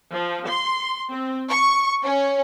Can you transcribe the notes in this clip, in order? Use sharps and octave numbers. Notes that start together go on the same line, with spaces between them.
F3
C6
C4
C#6
C#4